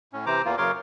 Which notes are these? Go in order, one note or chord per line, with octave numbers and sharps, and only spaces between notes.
A2 C#4
C3 E3 C5 A#5 D6
E2 E3 A#3 F4
F#2 C#3 A#4 C#5 C6 D6